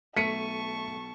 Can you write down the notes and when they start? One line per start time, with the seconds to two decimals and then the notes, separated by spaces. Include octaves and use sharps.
0.17 B1 A3 A5 C#6 B6 C#7 D#7